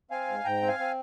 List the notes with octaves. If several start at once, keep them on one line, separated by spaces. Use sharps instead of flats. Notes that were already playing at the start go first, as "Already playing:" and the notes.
C4 F5 G#5
G#2
G#2 G5 A#5
C4
F5 G#5
C4